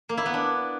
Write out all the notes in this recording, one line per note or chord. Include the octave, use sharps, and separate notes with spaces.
A#3
E4
B3
D4